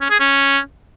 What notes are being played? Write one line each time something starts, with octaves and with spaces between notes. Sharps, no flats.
C#4
G#4
C#4